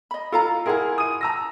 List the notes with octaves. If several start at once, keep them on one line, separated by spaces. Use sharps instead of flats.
D#5 B5
F4 A4 F5 A#5
E4 F4 G#4 A#4 F#5
D#6 D#7
A#5 E6 A#6